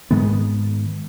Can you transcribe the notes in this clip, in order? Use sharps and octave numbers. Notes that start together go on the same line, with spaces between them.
G#2 D#3 G#3 B3